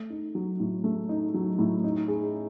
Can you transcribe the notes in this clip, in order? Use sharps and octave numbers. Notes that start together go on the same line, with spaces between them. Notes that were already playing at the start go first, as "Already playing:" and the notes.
Already playing: A3
D#4
F#3
A2
A3
D#4
F#3
A2
D#4
G#4